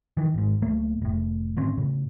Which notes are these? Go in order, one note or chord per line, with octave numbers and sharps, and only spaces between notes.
D#3 E3
G#1 G#2
D1 A3 A#3
F1 A2
G#1 D3 C4 C#4
A2 C#3